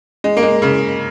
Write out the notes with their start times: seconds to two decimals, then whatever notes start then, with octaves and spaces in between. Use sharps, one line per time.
0.24 G#3
0.37 A#3
0.43 G#3
0.62 C#3